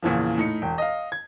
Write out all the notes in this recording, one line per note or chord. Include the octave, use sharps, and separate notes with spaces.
E2 A#2 C#3 E3 F3
A2 D#4 C#7
E1 G5
D#5 F5
G#6